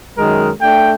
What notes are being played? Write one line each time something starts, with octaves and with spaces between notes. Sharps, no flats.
F#2 D#3 G#3 A#4
A3 D4 G5